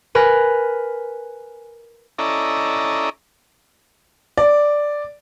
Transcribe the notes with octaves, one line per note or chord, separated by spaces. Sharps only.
A#4 B4 G#5
C#4 E4 A4 D5 D#5 A#5
D5